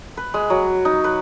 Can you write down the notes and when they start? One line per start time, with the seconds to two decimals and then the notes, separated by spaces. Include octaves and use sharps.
0.17 B4
0.34 G#3
0.50 F#3
0.85 D#4
1.04 B4